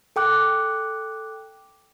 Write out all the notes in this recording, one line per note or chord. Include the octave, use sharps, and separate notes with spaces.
A4 G5 D6 F#6